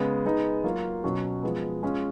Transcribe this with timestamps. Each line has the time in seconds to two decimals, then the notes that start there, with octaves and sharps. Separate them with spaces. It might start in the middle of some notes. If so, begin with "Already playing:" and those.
Already playing: C#3 G#3 B3
0.25 G#3 B3 D#4
0.64 F#3 A#3 F4
1.04 B2 F#3 C#4 F#4
1.43 F3 G#3 B3
1.83 G#3 C#4 F4